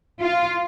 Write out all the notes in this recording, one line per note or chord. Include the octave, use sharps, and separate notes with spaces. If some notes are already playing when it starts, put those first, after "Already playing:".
F4